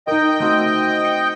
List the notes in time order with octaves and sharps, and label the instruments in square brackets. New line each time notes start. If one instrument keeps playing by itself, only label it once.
[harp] D#4 A#4 [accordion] D#5 G5 G6
[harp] A3 C4 F#4
C#7